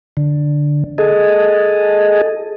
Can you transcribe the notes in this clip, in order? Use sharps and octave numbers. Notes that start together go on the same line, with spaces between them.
D3
G#4 A4 D#5